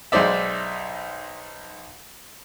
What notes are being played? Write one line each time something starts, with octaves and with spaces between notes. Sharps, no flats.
B1 G#3 D#4 C5 D5 E5